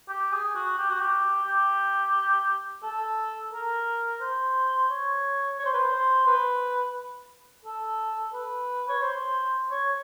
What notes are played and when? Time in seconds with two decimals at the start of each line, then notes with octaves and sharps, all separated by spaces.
0.09 G4
0.32 G#4
0.55 F#4
0.78 G4
0.90 F#4
1.00 G4
1.47 G4
2.83 A4
3.53 A#4
4.21 C5
4.90 C#5
5.59 C#5
5.65 C5
5.74 B4
5.80 C5
6.27 B4
7.65 A4
8.34 B4
8.89 C#5
9.02 C5
9.71 C#5